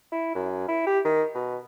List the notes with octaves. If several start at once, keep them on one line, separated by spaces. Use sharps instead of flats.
E4
F#2
E4
G4
D#3
B2